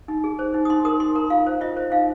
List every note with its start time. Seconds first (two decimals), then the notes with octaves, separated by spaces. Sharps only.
0.08 D#4
0.24 G#4
0.39 C5
0.54 D#4
0.65 D#6
0.70 D#4 C6
0.85 A#4 D#6
1.00 D#4 C6
1.15 A#4 A#5
1.30 F4 F5
1.47 C5
1.61 F4 D#5
1.77 C5
1.92 D#4 F5